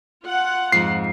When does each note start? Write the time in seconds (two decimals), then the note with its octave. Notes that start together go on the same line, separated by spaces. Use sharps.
0.24 F4 F#5
0.72 F2 G#2 C7